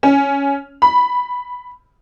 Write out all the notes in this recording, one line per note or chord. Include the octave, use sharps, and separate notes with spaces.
C#4
B5